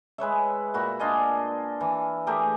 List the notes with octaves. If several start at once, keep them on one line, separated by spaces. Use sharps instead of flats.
G#3 B4 C#5 E5
A#2 F#4 E5 B5
D4 F4 D#5 G#5
E3
A3 G4 G#4 A#4